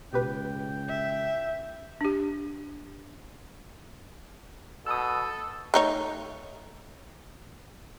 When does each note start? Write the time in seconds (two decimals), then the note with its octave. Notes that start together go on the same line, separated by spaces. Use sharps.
0.13 C#2 B2 G4 B4 G5
0.89 E5
2.01 D4 G4
4.86 B2 A4 D#6 E6
5.74 A3 D#4 C#5